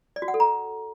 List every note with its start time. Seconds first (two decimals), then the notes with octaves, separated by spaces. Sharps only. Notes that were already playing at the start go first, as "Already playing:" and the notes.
0.16 D5
0.22 F#4
0.28 F#5
0.34 A4
0.40 A#5